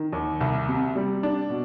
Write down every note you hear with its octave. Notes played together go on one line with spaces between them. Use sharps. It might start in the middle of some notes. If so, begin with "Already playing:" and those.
Already playing: D#3
D#2
C2
C3
G3
D4
B2